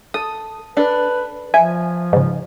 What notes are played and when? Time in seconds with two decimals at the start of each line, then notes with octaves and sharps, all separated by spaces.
0.14 A4 D#6
0.77 D4 A4 B4
1.54 F3 E5 G#5
2.13 G#2 C#3